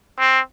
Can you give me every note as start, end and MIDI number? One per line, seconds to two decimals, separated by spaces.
0.19 0.40 60